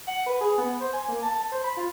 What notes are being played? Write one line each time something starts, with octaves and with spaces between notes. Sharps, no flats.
F#5
B4
G#4
B3
C5
G#5
A#3
A5
A5
C5
B5
F4